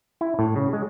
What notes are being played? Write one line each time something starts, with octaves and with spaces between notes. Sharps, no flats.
E4
A2
C#3
G#3